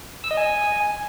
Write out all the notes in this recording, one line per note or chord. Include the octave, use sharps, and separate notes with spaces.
E6
D#5
G#5